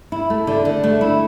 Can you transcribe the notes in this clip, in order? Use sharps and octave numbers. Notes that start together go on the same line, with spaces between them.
E4
A3
D3
D3
A3
E4